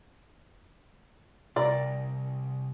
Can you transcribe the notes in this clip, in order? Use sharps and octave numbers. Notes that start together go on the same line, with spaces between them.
C2 A#4 D5